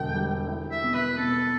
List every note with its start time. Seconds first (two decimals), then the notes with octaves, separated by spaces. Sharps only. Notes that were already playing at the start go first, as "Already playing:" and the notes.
Already playing: E1 D3 G5
0.14 G3
0.48 E4
0.71 E5
0.83 B2
0.94 B4
1.17 B2 A4